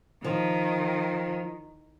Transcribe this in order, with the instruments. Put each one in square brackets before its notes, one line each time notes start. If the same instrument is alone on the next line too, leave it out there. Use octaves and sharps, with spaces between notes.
[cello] D#3 [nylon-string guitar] F3